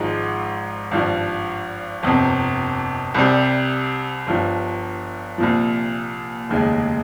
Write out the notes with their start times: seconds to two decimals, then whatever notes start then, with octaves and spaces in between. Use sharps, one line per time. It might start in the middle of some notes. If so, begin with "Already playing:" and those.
Already playing: G#1 G#2 F3 G#3 D#4
0.91 G#1 G2 F3
2.03 G1 F2 C3
3.14 C2 C3 G3
4.27 G1 G2 F3
5.38 C2 A#2 F3
6.49 F1 D#2 C#3 G#3